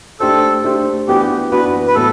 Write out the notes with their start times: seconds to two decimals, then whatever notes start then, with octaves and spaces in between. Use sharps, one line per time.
0.20 A3 D4 G4 A4 C5
0.64 A3 D4 G4 C5
1.08 E3 B3 D4 F#4 G4
1.51 E3 B3 D4 F#4 B4
1.87 B4
1.95 A2 F#3 B3 A4